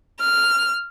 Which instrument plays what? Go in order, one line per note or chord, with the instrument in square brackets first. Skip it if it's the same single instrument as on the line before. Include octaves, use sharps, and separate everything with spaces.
[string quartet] F6